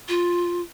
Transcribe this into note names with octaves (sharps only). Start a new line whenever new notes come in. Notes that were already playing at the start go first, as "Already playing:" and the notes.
F4